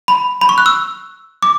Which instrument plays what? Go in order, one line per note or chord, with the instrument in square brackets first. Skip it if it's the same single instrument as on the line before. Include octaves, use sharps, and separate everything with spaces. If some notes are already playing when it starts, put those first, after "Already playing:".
[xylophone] B5
B5
C#6
F#6
E6
D6